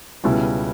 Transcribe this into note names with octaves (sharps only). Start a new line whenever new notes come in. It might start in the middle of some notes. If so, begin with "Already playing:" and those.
C#2 B2 G3 C#4 E4